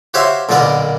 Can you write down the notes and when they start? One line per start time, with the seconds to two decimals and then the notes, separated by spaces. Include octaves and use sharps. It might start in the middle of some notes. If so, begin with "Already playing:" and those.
0.14 F#4 G4 C5 C#5 E5 F5
0.49 B1 A#2 D3 B3 A#4 D5